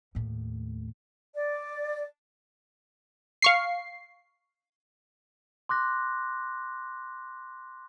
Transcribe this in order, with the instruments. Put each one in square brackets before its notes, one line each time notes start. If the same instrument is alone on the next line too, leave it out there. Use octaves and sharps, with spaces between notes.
[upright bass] D#2 A2
[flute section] D5
[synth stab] F5 C#6 C7
[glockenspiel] C6 D6 F#6 A#6